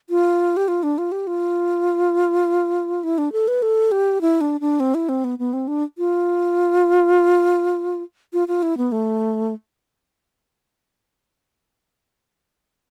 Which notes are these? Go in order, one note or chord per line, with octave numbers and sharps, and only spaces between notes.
F4
G4
F4
D4
F4
G4
F4
E4
D4
A4
B4
A4
G4
E4
D4
D4
C4
E4
C4
B3
B3
C4
D4
F4
F4
F4
E4
B3
A3